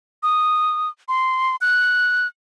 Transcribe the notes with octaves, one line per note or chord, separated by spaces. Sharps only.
D#6
C6
F#6